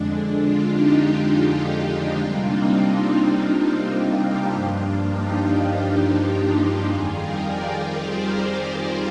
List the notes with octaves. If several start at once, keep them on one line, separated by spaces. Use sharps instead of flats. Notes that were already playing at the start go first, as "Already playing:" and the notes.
Already playing: F2 D3 G#3 D4
D4
D4 F4
D#4 G4
C3 G3 A#3 D4 F4
C4 D#4
C4 D#4
C4 D#4
D4 F4
D#4 G4
G2 F3 A#3 D4 F4
D#4 G4
D#4 G4
F2 D#3 G3 F4 G#4
G4 A#4
A#4 D5
G#4 C5